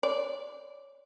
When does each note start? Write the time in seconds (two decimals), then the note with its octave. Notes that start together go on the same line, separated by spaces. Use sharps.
0.03 C#5 D5